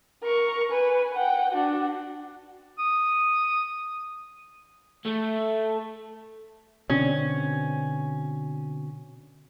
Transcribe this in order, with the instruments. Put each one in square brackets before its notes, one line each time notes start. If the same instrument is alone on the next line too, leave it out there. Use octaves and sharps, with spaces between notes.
[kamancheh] A#4 C#6
B4 G#5
F#5 G5
D4 F#4
[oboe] D#6
[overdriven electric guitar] A3
[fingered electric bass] B2 D3 C4 [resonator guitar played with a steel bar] C#4